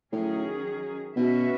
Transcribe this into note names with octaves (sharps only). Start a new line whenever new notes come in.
A2 D#3 F#3 C#4 G#4
B2 A3 C#4 F#4 B4 E5